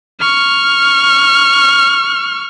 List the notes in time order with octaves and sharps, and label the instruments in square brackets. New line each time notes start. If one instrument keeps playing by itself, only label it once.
[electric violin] C#6 F6